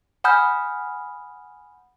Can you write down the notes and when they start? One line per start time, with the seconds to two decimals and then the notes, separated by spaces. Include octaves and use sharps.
0.24 F#5 G#5 B5 D#6 F6 G6